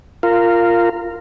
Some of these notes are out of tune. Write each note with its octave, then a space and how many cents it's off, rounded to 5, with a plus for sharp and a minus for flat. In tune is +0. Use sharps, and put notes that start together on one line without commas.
F4 -10 A#4 -15